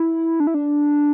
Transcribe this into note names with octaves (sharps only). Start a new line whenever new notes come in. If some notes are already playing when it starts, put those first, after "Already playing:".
Already playing: E4
D4
E4
D4